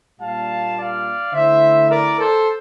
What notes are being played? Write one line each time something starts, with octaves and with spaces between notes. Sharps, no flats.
A#2 G3 A#3 D4 F4 F5 A5
D5 F5
D3 A3 E4 C5 E5
A#4 D5
A4 C5